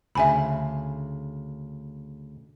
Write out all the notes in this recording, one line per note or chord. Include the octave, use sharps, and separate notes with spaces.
D2 C#3 E5 G#5 B5